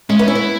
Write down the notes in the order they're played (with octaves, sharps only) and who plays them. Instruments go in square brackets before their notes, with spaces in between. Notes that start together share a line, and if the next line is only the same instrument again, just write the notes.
[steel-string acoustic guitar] G#3 [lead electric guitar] C#4
[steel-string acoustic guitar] B3
[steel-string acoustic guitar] C#4 [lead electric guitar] E4
[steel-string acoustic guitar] B3